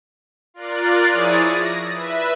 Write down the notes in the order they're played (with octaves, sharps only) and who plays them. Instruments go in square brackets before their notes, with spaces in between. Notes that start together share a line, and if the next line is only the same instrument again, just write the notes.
[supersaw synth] F4 A#4 D5 F#6
F3 E4 G#4 C#5 D5 D#6
A#6
B4 E5